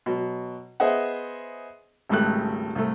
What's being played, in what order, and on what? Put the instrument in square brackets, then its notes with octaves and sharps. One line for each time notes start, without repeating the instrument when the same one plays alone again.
[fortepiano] B2 F#3
B3 G#4 C5 D#5 E5 F#5
G#1 C#2 G3 A3 F#6
C2 A3